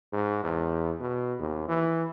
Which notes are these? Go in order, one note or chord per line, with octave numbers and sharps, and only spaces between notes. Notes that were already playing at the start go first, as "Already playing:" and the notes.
G#2
E2
B2
D#2
E3